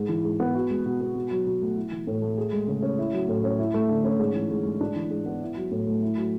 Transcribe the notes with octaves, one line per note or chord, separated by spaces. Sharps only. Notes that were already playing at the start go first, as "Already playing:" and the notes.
Already playing: G#2
E3
G#2
B3
F#4
G#3
B2
B3
B2
F#3
B2
A3
E4
E3
A2
A3
G#4
G#3
C#3
C#4
E4
F#3
A2
C#4
E4
A3
D3
C#4
G#2
E3
G#2
G#3
D4
E3
G#2
B3
E4
F#3
A2
A3
E4
F#3